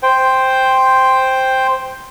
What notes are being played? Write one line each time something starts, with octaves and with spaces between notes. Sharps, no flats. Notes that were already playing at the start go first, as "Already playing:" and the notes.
C5 G5